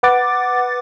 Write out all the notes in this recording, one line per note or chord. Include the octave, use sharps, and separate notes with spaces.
B4 F#5 D6 A6